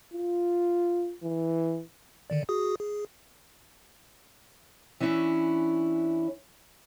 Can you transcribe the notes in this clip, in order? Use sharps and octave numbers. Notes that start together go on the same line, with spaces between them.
F4
E3
D3 D#3 D5
F#4 G#4 D#6
G#4
E3 C#4 D4 E4 C#5